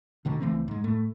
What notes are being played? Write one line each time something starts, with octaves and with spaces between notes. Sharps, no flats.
D2 B2 D3 D#3
C#2 E3 A3 C4
G#2 G#3
A2 A3